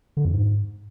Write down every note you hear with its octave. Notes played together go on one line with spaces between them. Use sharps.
D3
F2
G#2